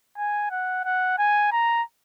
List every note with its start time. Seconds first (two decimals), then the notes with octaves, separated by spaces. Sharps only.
0.17 G#5
0.51 F#5
0.85 F#5
1.18 G#5
1.52 A#5